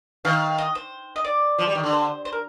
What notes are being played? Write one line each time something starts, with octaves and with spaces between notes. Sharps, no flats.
D#3 F5
D#5
C5
D#5
D5
F3
G3
D#3
D3
C5
C5
A#4